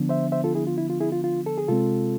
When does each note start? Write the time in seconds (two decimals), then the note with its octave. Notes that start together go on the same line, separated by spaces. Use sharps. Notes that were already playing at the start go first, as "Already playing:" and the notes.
Already playing: D3 F3 B3 D4
0.09 C5 E5
0.32 C5 E5
0.44 F4 A4
0.55 E4 G#4
0.67 F4
0.78 E4
0.90 F4
1.00 E4 G#4
1.12 F4
1.24 F4
1.46 A4
1.58 G#4
1.68 C3 G#3 C4 F4 A4